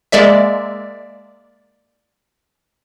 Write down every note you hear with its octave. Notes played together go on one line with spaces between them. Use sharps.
G#3 A#3 D5 E5